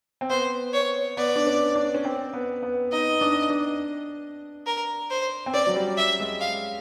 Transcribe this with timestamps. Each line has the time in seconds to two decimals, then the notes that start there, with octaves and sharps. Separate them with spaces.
0.21 C4
0.30 B3 C5
0.73 C#5
1.17 B3 D5
1.36 D4
1.47 C#4
1.75 D4
1.94 C#4
2.05 C4
2.33 B3
2.63 B3
2.92 D#4 D#5
3.21 D4
3.50 D4
4.66 A#4
5.11 C5
5.46 C4
5.54 C#4 D5
5.67 F#3
5.76 G3
5.97 E5
6.20 G#3
6.41 F5